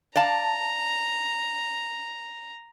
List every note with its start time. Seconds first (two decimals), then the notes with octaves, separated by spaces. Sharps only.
0.16 D5 F5 A5 A#5